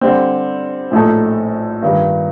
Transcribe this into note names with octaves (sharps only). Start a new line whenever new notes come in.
D3 G3 C4
A#1 A2 A3 D#4 A4
G2 D#3 G3